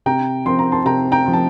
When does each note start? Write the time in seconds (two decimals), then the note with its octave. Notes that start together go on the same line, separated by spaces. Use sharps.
0.06 C3 G5 A#5
0.45 F3 C4 C6
0.59 A#5
0.72 A5 C6
0.86 C3 G5 A#5
1.12 G5 A#5
1.26 F3 C4
1.33 A5